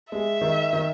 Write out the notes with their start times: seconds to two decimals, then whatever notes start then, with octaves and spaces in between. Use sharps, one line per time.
0.12 G#3 E5
0.41 D#3
0.73 D#3